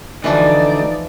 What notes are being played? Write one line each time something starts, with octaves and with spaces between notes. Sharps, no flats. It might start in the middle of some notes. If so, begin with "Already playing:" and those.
D2 E3 F3 D#4 D5